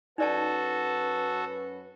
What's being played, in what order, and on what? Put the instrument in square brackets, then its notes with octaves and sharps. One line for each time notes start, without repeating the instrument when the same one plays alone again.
[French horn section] F#2 C#4 B4 [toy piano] D#4 D5 A5 [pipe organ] F#4 A4